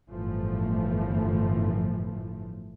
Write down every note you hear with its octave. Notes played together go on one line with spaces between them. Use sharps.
G1 F#2 A2 E3 F3 A3